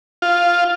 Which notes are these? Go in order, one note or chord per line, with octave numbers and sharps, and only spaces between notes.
F4